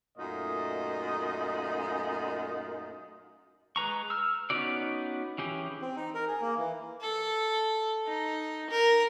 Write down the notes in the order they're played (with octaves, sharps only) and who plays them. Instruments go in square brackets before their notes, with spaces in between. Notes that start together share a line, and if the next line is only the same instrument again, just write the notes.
[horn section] F#2 A#2 A3 D#4 F4 D#5
[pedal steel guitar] G#3 B4 A#5 C#6
E6 F6
B3 C#4 D#4 F#4 D5
E3 C#4 G4 G#4
[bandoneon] C4
D#4
A#4
G#4
A#3
E3
[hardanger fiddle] A4
D#4
A#4